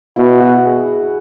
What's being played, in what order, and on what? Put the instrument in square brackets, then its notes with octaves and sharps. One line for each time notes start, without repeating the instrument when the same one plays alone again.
[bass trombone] B2 [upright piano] E4
[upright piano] F#4
E4
G#4